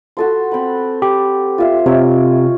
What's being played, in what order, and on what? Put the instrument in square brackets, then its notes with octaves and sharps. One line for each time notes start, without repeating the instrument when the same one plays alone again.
[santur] F#4 A4 C6
C4 B5
[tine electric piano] G4
[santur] F4 E5 C6
[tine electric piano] C3 [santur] C#5 D#5 G5